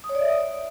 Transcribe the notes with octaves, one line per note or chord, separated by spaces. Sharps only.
D#6
C#5
D5
E5